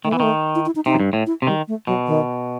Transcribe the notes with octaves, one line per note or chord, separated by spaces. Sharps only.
D#3 A3
E3 B3
D#3 A3
E4
E4
D#4
C3 D#4
F#2
G2
A2
E4
C3
D#3 G3
A3
B2 F#3
D#3